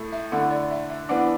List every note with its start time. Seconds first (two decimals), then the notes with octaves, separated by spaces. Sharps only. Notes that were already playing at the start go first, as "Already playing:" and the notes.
Already playing: A2 A3 E4
0.12 E5
0.32 D3 A3 E4 F#5
0.51 D5
0.71 E5
0.90 E5
1.09 E3 B3 D4 F#5